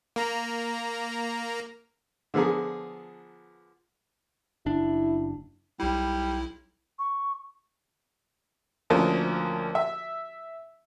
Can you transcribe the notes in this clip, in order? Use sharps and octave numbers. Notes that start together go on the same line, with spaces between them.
A#3 A#5
D3 F3 B3 G#4 A#4
F#1 D4 E4
B1 G3 E4
C#6
D2 F3 A#3 C#4
E5